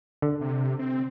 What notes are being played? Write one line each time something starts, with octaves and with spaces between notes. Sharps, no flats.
D3
C3
C4